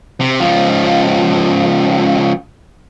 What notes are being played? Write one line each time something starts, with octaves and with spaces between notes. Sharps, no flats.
C3
C#2 F3